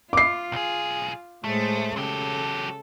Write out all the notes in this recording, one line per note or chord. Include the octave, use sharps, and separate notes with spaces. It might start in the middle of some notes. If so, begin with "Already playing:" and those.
F4 D6 C7
B1 G#4
A2 G#3 A3 C5
C#3 F#3 G4 A4